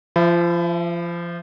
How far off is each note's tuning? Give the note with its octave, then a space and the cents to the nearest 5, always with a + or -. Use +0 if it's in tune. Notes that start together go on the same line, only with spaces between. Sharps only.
F3 -25 E5 +30 B5 +25